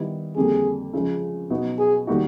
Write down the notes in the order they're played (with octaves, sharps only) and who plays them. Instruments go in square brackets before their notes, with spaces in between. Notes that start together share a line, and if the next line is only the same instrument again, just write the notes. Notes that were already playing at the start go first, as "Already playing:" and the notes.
Already playing: [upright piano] D#3 G3 B3 E4
[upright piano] F2 D3 G3 A#3 [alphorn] G#4
[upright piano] F#2 C#3 F3 G#3 C#4
B2 F#3 B3 D#4 F#4
[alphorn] G#4
[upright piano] D#3 G3 A#3 D#4 F#4